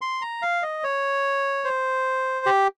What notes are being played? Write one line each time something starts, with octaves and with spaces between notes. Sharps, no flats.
C6
A#5
F5
D#5
C#5
C5
G4